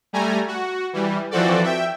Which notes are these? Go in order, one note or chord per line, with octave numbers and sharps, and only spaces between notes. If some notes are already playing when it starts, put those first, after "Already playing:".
G3 A3 G#5 A#5
F#4
E3 G3
E3 F3 C4 F#4 A4 D5
E5 G5